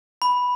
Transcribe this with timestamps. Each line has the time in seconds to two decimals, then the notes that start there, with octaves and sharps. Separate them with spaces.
0.22 B5